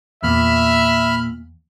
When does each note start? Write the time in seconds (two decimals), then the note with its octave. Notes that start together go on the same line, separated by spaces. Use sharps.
0.23 E2 A#2 E5 B5 F6